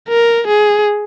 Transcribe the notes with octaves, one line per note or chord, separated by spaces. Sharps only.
A#4
G#4